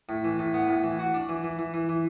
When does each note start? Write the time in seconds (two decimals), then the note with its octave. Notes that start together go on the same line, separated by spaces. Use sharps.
0.09 A2
0.24 E3
0.39 A2
0.54 B3
0.69 A2
0.84 E3
0.99 F#4
1.14 D4
1.29 E3
1.44 E3
1.59 E3
1.74 E3
1.89 E3